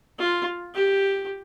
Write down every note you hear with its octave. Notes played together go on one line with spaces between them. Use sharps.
F4
G4